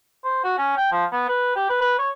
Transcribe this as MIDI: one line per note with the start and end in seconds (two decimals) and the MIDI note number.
0.24 0.43 72
0.44 0.54 66
0.58 0.76 61
0.77 0.87 79
0.92 1.05 53
1.12 1.24 59
1.28 1.52 71
1.56 1.67 67
1.70 1.78 71
1.81 1.95 71
1.99 2.09 73